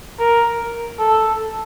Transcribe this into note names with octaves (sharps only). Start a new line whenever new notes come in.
A#4
A4